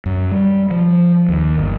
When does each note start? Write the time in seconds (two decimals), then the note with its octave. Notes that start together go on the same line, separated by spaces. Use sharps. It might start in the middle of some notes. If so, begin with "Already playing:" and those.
0.06 F#2
0.31 G3
0.71 F3
1.29 D#2
1.58 G1